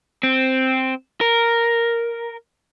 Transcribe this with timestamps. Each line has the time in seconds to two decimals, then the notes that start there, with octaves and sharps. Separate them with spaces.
0.23 C4
1.21 A#4